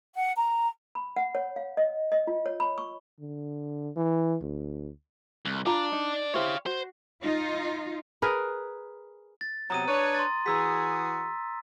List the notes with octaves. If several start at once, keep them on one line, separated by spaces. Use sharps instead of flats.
F#5
A#5
B5
F#5
C#5
F5
D#5
D#5
F4
C#5
B5
C#6
D3
E3
D2
C2
D4 F4 D5 A#5 B5
D#4
E4 G4 C5 C#5 F5
F#4 C5
D#4 F4
G#4 A#4 B4
A6
C3 F#3 B3 A#5 D#6 D#7
D4 B4 C#5
C6 A6
E3 F#4 G#4 A#5 E6 B6